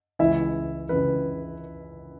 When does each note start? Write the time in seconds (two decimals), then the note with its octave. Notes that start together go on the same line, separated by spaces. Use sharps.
0.19 C#2 C#3 E3 E4 E5
0.89 C#2 C#3 E3 B4